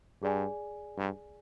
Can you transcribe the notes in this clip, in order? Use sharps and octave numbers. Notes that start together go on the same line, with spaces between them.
G2 G#4 D5 G#5
G2